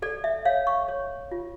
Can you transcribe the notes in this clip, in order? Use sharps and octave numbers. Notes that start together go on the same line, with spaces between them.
A4 D5
E5
C#5 F5
C#6
C#5
F4